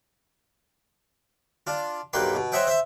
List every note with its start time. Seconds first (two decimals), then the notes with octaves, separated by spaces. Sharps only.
1.67 D4 F4
2.13 B1 G2 A#3 B4 G5 C6
2.35 B2
2.52 C5 C#5 D#5 E5 F#5 G5
2.67 C5 E5